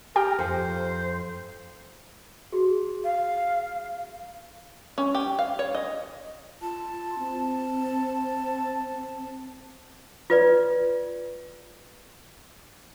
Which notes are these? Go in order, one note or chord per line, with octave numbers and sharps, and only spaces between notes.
G4 A#4 G5
F2 C5
F#4 G#4
F5
C#4
G4
F5
C#5
D#5
F4 A5
C4
F4 B4 D5